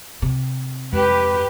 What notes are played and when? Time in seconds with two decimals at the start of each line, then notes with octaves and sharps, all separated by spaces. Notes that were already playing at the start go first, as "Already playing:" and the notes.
0.22 C3
0.92 F2 G#3 G4 B4